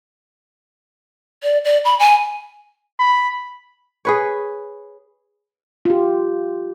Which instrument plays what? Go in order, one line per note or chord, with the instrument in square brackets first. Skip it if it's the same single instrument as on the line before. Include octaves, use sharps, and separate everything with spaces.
[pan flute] D5
D5
B5
G#5
[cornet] B5
[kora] G#4 B4 C#5
[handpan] F4 G4